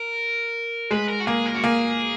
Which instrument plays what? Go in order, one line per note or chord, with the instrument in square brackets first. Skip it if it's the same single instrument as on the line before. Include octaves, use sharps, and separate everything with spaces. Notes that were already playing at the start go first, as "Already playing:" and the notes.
Already playing: [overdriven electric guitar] A#4
[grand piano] G#3 [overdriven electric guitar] B4
[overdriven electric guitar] A#4
F#4
[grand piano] A#3 [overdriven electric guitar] G#4
[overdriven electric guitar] A#4
F#4
[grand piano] A#3 [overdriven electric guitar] G#4